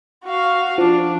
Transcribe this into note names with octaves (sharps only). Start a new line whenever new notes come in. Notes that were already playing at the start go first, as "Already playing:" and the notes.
F#4 F5
F3 D4